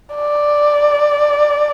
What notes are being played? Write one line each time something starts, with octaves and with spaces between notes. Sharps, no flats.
D5